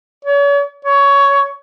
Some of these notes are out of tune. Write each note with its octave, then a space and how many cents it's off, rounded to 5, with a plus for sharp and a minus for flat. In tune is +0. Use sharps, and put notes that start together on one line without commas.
C#5 +40
C#5 +15